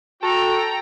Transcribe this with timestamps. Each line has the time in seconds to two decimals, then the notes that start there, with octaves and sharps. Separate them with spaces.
0.23 F#4 A4 G5 A#5